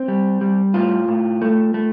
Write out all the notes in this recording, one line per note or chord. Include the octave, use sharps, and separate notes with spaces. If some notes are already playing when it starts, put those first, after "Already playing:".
Already playing: C4
G3
G3
A2 F4
A2
A3
A3